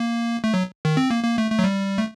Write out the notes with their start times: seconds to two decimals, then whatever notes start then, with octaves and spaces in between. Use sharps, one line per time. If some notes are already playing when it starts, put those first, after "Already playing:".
Already playing: A#3
0.44 A3
0.54 F#3
0.85 D#3
0.97 C4
1.10 A#3
1.24 A#3
1.38 A3
1.51 A3
1.59 F#3
1.64 G3
1.98 A3